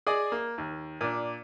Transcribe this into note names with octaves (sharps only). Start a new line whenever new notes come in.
G#4 D5 D#5
A#3
D#2
A#2 D4